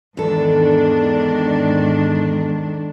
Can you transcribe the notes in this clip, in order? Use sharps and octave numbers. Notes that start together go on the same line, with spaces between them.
E2 G#2 D#3 D4 A4